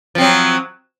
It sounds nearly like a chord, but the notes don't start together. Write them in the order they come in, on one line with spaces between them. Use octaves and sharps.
F3 C4 F#3